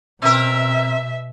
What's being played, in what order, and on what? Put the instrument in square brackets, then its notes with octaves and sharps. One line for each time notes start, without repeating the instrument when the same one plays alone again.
[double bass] B2 [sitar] C4 A#4 [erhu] E5